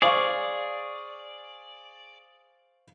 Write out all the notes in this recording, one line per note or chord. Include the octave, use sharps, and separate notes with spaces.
G#4 C5 D5 F5 C#6